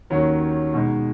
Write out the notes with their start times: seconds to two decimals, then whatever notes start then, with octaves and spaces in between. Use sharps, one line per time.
0.10 D#2 D#3 F#3 C#4
0.73 B2 G#3 D#4